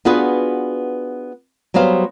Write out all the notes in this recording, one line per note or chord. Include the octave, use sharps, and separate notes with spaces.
B3 D4 F4 F#4 G#4 B4
F#3 G3 B3 C5 F5